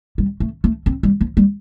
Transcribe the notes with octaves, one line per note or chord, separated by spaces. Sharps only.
G3
A3
A3
C4
G3
F3
G3